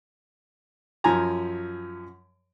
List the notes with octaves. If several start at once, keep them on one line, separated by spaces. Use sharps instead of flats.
F#2 F3 G#5 A#5